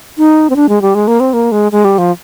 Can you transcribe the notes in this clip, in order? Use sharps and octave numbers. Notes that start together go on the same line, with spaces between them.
D#4
C4
D4
G#3
G3
G#3
A#3
C4
A#3
G#3
G#3
G3
F3